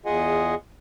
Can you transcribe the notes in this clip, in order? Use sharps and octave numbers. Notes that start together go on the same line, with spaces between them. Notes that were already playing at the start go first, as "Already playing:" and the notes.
E2 F4 G#4 D#5 F#5 G#5